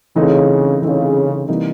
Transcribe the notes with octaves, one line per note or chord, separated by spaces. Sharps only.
C#3 E3 A3 C4 D#4
C#3 E3 A3 C4 D#4
C3 E3 G3 A#3 D#4